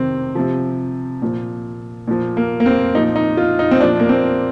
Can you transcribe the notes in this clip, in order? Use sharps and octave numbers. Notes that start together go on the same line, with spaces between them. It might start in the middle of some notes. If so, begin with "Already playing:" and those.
Already playing: C3 D#3 C4
C3 F3
A#2 F3
A#2 F3
A#3
A#3
C4
A#2 F3 D#4
D#4
F4
D#4
C4
A#2 F3 D4
A#3
C4